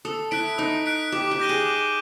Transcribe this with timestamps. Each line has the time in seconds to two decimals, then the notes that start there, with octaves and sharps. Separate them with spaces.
0.05 A4 D#6
0.31 E4 F#6 B6 D7
0.58 D#4 D#6
0.86 F#6 B6 D7
1.12 G4 D6
1.31 G4
1.39 G6 A#6 D#7 G7
1.49 G#4
1.66 D6